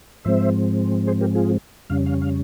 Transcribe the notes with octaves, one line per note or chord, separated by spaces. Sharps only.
G#2 F3 G#3 C4 C5 E5
G#4 C5
G4 A#4
F4 G#4
F2 C#3 G3 C#4 F5
F5
F5